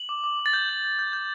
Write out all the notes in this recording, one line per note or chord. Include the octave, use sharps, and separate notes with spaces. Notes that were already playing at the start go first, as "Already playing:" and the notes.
Already playing: F#7
D6
D6
D6
A6
G6
G6
G6
G6
G6